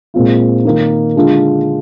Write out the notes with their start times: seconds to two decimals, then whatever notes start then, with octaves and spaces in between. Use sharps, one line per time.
0.14 A#2 G#3 C4 F4
0.65 D#3 A#3 D#4
1.16 D3 G#3 D4 F4